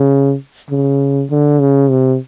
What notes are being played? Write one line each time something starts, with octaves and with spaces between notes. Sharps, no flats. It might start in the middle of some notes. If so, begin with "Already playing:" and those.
Already playing: C#3
C#3
D3
C#3
C3